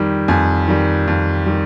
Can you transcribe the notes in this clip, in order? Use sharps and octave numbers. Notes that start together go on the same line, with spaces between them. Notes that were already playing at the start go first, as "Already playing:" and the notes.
Already playing: F2 D#3 G3
F2 G#5
D#3 G3
F2
D#3 G3